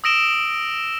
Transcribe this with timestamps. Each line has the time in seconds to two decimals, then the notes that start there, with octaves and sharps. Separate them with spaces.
0.04 D#6 E6 A#6 D7 E7 G7